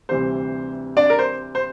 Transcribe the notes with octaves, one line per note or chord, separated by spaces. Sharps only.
D2 C3 E3 G3 C5
D4 D5
A#4
C5
C5